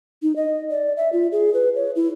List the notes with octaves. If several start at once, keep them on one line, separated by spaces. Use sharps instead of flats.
D#4
D#5
D5
E5
F4
G#4
B4
C#5
E4